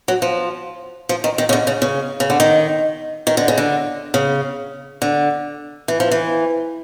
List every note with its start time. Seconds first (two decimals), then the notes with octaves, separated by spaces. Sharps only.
0.08 F#3
0.22 F3
1.09 F3
1.24 D#3
1.38 D#3
1.49 C#3
1.53 D3
1.67 C#3
1.82 C#3
2.20 C#3
2.30 D3
2.40 D#3
3.27 D#3
3.37 D3
3.48 C#3
3.58 D3
4.14 C#3
5.02 D3
5.88 E3
6.00 F3
6.11 E3